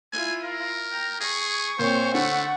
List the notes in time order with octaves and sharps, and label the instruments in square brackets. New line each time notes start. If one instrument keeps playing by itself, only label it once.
[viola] E4 F4 [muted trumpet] G#5
[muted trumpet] A#4
[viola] G5 A#5
[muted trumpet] G#4 [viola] C#6
[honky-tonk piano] A#2 [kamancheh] C4 C#5 [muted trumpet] C5
[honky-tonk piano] D3 [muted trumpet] A3 [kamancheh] F#5